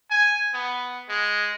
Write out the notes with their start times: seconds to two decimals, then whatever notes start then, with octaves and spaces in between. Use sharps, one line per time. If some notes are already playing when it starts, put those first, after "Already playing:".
0.10 G#5
0.54 B3
1.09 G#3